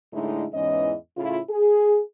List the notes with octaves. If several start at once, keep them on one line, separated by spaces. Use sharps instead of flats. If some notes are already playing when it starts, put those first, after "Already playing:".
A2 D3 G#3 A3 D#4 E4
E2 G#2 E3 C#4 D#5
A2 C#3 E4 F4
G#4